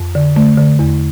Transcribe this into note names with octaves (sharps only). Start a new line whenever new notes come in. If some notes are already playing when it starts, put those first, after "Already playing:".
Already playing: F2
D3
D3 A3
D3
E2